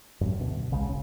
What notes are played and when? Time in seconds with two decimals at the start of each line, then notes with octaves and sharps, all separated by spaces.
0.21 F#2 A2 C4
0.38 D2 B2
0.70 B1 C#3 G3 G#3
0.89 G1 C#4